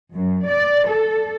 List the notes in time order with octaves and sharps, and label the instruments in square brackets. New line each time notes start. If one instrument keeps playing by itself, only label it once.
[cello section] F#2
D5
A4